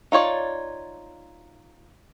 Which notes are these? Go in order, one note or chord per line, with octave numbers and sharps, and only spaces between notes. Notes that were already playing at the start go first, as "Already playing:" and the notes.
D#4 F4 C#5 D5